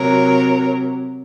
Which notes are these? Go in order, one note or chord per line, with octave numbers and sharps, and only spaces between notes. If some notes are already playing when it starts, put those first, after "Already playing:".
Already playing: C3 F#3 A#4 C#5